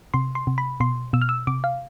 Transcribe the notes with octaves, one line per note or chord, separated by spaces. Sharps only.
C3 C6
C6
C3
B5
B2 C6
B2 E6
F6
E6
C3 D6
F5